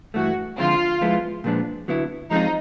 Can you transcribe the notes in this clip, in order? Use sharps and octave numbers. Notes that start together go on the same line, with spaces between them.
G2 E3 A3 F#4
D3 F3 G#3 C4 F4
F3 G#3 B3 E4
A#2 F3 G#3 B3 D4
D3 F#3 B3 E4
F3 G#3 C4 D#4 F4